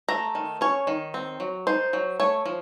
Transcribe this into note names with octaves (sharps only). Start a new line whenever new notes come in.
A3 A#5
D#3
C#4 C#5
D#3
C4
F#3
D#4 C5
F#3
A3 C#5
F3